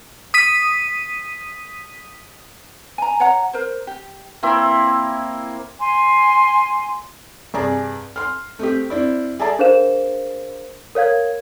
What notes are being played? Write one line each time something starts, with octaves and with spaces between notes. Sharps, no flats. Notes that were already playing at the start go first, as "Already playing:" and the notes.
D#6 B6 D#7
G#5 A#5
C#5 F#5 A#5
A#4 C5
G4
A#3 C4 E4
G#5 C6
G2 C3 G#4 D5 A#5
C6 F6
A3 C4 G4
C4 D4 E4
G#4 A4 D5 E5 A5 A#5
D4 G#4 A#4 C5 F5 E7
A#4 C#5 F5 G#6